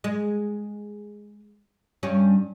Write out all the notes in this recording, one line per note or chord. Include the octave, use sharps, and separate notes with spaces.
G#3
G2 G3 C#4